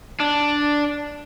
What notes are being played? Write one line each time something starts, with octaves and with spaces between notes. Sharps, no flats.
D4